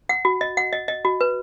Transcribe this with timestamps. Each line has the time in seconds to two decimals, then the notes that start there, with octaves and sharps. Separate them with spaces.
0.09 F#5
0.25 F#4
0.41 D#5
0.57 F#5
0.73 D#5
0.88 D#5
1.05 F#4
1.21 B4